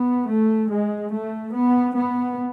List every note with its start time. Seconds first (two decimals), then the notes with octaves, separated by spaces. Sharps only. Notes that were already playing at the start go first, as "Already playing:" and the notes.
Already playing: B3
0.29 A3
0.70 G#3
1.11 A3
1.52 B3
1.94 B3